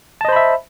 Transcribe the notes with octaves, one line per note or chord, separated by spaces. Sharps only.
C5 D#5 E5 A5 B5